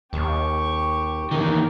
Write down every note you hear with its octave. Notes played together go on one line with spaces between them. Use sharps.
D#2 G4 C#6
E2 D#3 A#3